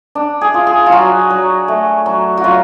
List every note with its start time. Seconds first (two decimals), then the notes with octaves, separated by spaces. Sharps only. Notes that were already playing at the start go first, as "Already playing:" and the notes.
0.15 D4
0.41 G#4
0.54 F4
0.67 G#4
0.86 F4
0.92 F#3 F#4
1.30 F#3
1.68 A3
2.06 F#3
2.37 F#4
2.44 F#3 F4